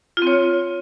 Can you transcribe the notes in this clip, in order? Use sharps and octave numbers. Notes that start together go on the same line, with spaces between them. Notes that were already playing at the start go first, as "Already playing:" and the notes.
C4 F4 C#5